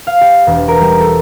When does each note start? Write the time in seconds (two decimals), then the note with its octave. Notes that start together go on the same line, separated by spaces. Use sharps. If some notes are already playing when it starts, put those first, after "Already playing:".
0.07 F5
0.21 G4
0.47 E1
0.68 A#4
0.81 G3
1.01 A4